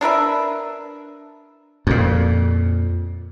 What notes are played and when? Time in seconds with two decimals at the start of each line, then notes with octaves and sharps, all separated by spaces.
0.01 D4 A#4 B4 E5
1.87 F2 A#2